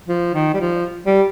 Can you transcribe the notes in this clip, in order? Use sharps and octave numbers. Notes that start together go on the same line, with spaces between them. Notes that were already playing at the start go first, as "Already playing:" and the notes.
F3
D#3
G3
F3
G3